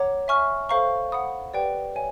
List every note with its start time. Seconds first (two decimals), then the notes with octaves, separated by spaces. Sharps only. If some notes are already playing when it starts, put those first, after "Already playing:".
Already playing: C#5 F#5 A#5 D6
0.28 E5 G#5 C#6 F6
0.69 A4 C5 F5 A#5 C#6
1.12 F#5 B5 D#6
1.53 G4 B4 D5 G5
1.95 C#5 E5 G#5